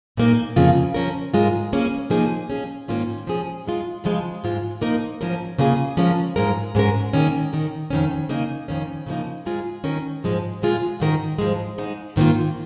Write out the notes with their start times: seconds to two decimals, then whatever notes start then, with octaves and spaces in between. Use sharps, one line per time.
0.17 A#2 A#3 D#4 A#4
0.56 F2 C#3 A#3 F4 G#4
0.94 F3 C#4 A#4
1.34 G#2 G#3 F4 A#4
1.73 C#3 A#3 C#4 G#4
2.10 F3 A#3 D#4 G#4
2.50 F3 C#4 G#4
2.88 G#2 D#3 A#3 C#4 F4
3.27 F3 C#4 G#4
3.65 G#2 G#3 F4
4.04 C#3 F3 G#3 F4
4.44 G#2 G#3 F4
4.81 F3 A#3 D#4 A#4
5.21 G#2 F3 C#4 A#4
5.59 C#3 A#3 F4 G#4
5.97 F3 G#3 C#4 A#4
6.36 G#2 G#3 F4 A#4
6.75 G#2 G#3 C#4 A#4
7.13 D#3 A#3 C#4 G#4
7.53 D#3 C#4 A#4
7.90 F2 D#3 C#4
8.29 C#3 A#3 D#4 G#4
8.68 F2 D#3 C#4
9.06 C#3 F3 A#3 D#4
9.45 G#2 G#3 F4 G#4
9.84 D#3 C#4 A#4
10.22 G#2 F3 G#3 C#4
10.62 A#2 G#3 F4 G#4
11.00 G#2 D#3 C#4 A#4
11.39 G#2 F3 G#3
11.78 G#2 G#3 D#4
12.16 G#2 D#3 A#3 F4